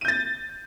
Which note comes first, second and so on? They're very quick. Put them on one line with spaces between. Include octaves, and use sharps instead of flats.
D#7 G6 A6